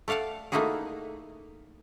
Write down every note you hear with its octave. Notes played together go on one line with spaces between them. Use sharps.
A3 D5 F5 F#5 A5
A3 A#3 D#4 E4 F#4 G#4